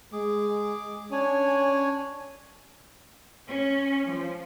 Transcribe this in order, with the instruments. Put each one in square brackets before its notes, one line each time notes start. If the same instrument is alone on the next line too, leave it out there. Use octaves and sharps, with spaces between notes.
[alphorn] G#3 [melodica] G#4 D6
[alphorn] C#4 [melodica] D4 C#5 G#5
[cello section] C#4
F3